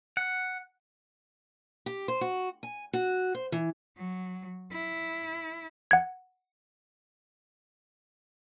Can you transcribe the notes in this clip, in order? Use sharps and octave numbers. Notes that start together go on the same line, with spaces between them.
F#5
G4
C5
F#4
G#5
F#4
C5
E3
F#3
E4
F#5 G#6